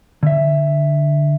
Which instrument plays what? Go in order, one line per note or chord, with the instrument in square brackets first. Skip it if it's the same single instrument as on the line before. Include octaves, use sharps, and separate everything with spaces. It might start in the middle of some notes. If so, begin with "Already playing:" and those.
[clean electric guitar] D3 E5